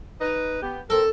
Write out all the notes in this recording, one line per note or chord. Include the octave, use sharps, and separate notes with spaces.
D#4 B4
B3 G4
C4 A4 A#4